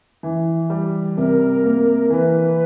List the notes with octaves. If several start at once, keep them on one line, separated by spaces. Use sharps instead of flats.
E3
G3
C3 A#4
A#3
E3 B4